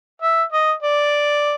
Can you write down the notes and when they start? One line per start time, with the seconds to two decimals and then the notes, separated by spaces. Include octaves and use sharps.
0.22 E5
0.52 D#5
0.82 D5